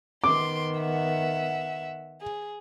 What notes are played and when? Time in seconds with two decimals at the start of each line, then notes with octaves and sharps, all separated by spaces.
0.24 D#3 B3 C6 D6 D7
0.80 E5 F#5
2.21 G#4